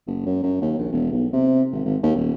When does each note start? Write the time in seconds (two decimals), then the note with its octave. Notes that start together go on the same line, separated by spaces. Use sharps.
0.07 F#1
0.26 F#2
0.43 F#2
0.61 D#2
0.78 A#1
0.92 E1
1.11 B1
1.33 C3
1.72 G#1
1.85 G#1
2.03 D#2
2.16 D#1